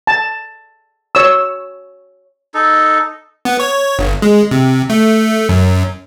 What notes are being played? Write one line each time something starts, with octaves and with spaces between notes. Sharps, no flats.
A5
C#5 E6
D#4 A4
B3
C#5
G1
G#3
C3
A3
F#2